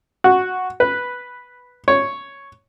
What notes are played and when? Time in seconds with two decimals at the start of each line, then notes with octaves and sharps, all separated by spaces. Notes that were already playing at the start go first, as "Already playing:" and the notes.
0.24 F#4
0.80 B4
1.88 C#5